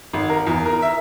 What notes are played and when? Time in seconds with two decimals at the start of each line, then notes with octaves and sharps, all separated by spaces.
0.13 G#1
0.29 A#4
0.46 E2
0.65 A#4
0.82 E5